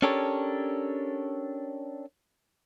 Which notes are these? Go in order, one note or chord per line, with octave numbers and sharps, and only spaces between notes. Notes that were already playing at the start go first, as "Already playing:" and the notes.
C#4 D4 G4 A4 A#4 C#5